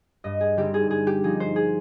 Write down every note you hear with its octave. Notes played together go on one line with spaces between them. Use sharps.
G2 D#5
G#4
D3 G3 C4 D#4 G4
G#4
G2 G#4
G4
F3 C4 D#4 G#4
C5
G#4